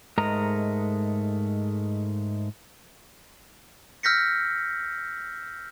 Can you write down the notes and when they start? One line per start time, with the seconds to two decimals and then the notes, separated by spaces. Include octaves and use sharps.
0.18 G#2 G#3 A3 A#4 D#5 A#5
4.03 E6 F6 G6 A#6 B6 C#7